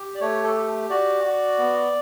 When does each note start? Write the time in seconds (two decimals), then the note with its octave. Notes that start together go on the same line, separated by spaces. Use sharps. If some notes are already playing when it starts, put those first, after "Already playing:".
Already playing: G4
0.15 D5
0.21 A3 C#5
0.43 A4
0.55 G4
0.90 F#4 D5
1.24 F#4
1.59 B3